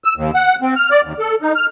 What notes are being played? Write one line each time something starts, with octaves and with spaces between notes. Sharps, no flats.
E6
D#2
F#5
C4
F6
D5
D#2
A4
D#4
F6